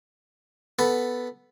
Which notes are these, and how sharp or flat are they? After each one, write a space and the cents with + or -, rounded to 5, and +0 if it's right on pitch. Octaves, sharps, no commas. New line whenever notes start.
B3 +0 A4 +0 B5 +5